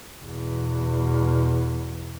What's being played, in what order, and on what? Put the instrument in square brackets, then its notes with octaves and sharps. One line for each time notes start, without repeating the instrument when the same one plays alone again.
[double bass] E2 B2